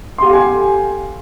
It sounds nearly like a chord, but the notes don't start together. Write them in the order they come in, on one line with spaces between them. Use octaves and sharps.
C6 G4 F5 A4 G#5